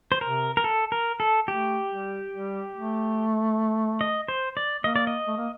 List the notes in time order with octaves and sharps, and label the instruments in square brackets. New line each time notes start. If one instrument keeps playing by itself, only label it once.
[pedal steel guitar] C5
[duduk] C3 [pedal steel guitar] A#4
[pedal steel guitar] A#4
A4
A#4
A4
[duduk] A3 [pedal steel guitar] G4
[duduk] G3
G3
A3
[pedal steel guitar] D#5
C5
D5
[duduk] A#3 [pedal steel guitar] D#5
[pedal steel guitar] D5
D#5
[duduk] A3
A#3